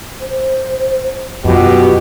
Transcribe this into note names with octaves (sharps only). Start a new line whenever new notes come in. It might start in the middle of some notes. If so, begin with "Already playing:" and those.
C5
F#2 B2 F#3 F4 G4